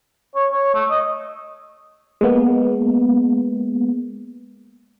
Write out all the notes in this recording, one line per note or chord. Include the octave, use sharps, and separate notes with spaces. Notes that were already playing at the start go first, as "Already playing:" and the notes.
C#5
C#5
A3
D#5
G#3 A#3 B3